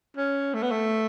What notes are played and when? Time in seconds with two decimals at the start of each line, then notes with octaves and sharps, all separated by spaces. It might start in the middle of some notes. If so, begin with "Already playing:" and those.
0.17 C#4
0.54 A3
0.63 B3
0.71 A3